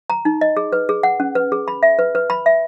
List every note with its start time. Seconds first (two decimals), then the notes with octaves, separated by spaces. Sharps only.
0.10 A#5
0.25 D#4
0.41 D#5
0.57 G#4
0.73 B4
0.89 G#4
1.03 F#5
1.20 C#4
1.35 B4
1.52 G#4
1.68 B5
1.83 E5
1.99 B4
2.15 B4
2.30 B5
2.46 E5